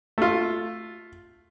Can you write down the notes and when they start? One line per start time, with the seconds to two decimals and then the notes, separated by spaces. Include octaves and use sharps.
0.18 A3 F4